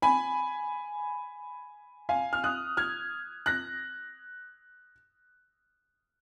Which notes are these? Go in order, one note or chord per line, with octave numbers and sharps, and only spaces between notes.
G#5 B5
F5 G#5
F6
D#6 F#6
F6 G#6
F#6 A#6